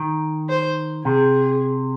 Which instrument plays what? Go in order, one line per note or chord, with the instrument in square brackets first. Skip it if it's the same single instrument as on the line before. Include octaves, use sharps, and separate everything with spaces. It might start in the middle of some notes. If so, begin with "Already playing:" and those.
Already playing: [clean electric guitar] D#3
[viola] C5
[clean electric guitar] C3 [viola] G#4